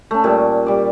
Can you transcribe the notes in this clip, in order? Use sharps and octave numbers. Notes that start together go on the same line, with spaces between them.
A3 C#4
A#2 G3
G3 D5